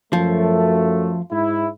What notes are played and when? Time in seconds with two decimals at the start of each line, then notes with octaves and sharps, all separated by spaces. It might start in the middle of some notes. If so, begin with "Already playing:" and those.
0.13 F#2 F3 A3
1.31 G#2 E4